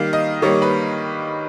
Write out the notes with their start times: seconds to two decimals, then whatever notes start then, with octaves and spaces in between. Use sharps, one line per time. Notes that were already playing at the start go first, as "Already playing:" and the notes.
Already playing: D#3 G3 A#3 F5
0.13 D#5
0.42 D#3 G3 A#3 C#5
0.62 B4